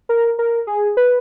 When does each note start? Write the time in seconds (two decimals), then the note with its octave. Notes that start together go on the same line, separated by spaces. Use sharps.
0.09 A#4
0.39 A#4
0.67 G#4
0.97 B4